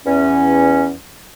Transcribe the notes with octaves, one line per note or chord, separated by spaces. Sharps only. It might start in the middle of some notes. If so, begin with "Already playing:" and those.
E2 C#4